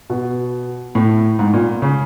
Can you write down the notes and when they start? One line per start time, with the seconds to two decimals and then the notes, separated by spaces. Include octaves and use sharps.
0.10 B2
0.95 A2
1.39 G#2
1.53 A#2
1.82 C#3